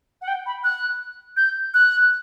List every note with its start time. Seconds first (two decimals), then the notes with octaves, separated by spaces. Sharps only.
0.21 F#5
0.27 G5
0.46 B5
0.64 F#6
1.37 G6
1.74 F#6